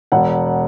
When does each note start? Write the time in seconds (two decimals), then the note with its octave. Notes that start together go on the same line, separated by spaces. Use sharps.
0.12 E1 F#5